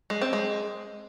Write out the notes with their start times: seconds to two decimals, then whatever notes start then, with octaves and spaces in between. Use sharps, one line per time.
0.10 G#3
0.21 C4
0.33 G#3